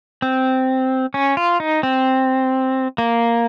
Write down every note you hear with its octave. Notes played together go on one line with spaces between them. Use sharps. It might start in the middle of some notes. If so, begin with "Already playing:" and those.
C4
C#4
F4
D#4
C4
A#3